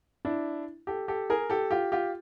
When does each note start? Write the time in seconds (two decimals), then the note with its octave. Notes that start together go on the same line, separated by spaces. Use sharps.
0.25 D4 E4
0.87 G4 A4
1.08 G4 A4
1.30 G#4 A#4
1.50 G4 A4
1.71 F4 G4
1.92 F4 G4